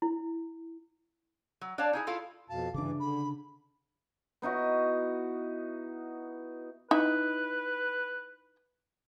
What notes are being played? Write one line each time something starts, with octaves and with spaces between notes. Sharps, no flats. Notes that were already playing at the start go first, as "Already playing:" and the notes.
E4
F#3
D4 C#5 D5 F5 A5
D#4 E4 G#4
E4 F4 A4 F5
F2 B2 F5 A5
G2 C#3 E3 D4 D6
D3 B5
B3 D#4 E4 F#4
D#4 E4 B4